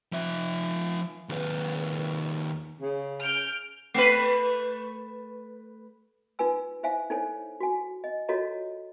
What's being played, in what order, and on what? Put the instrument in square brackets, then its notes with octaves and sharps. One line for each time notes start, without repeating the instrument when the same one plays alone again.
[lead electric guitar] F3 E5
D#2 B4
[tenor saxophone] C#3
[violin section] F6 G6 D7
[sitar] A3 B4
[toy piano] D#4 F4 B4 G#5 E6
E4 C5 E5 F5 G#5
D#4 E4 A4 C5 C#5 G#5
F#4 G#5
D#5
F4 F#4 A4 C#5 D#5 A#5